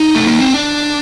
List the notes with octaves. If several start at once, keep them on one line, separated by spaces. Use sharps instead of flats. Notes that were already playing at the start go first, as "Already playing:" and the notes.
Already playing: D#4
A3
A#3
C4
D4